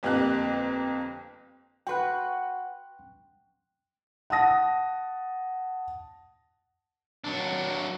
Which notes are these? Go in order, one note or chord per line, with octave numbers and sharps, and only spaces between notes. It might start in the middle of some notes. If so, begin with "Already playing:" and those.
G1 F2 A#3 G4 F#6
F#4 B4 G5 C6 F#6
F#5 A5 D#6 A#6
F#3 D4